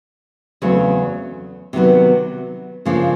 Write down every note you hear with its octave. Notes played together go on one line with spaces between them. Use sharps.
E2 C#3 F#3 A3 C4
C3 D#3 F#3 B3
C#3 F3 A#3 D4